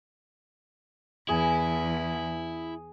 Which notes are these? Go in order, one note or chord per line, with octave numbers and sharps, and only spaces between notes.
E2 E4 G#4